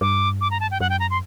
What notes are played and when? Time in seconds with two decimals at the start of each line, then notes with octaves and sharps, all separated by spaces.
0.01 G2 D6
0.41 D6
0.51 A#5
0.60 A5
0.71 G5
0.80 F#2 F#5
0.90 G5
1.00 A#5
1.10 C6